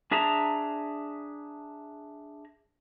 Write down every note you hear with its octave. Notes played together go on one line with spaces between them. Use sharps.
D4 G#4 E5 A5 A#5